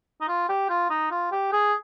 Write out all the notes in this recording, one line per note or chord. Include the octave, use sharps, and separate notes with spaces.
D#4
F4
G4
F4
D#4
F4
G4
G#4